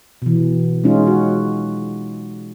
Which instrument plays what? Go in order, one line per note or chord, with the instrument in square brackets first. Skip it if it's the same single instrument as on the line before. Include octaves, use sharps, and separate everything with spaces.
[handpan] B2 E3
G#3 C#4 D#4 F4
F#4